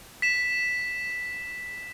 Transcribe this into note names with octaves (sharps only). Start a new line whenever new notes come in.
B6 E7